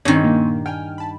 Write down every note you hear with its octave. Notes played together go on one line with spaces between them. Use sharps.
G2 D#3 C4 C#4
A#2 A#3
G5 G#5 F6
A5 B5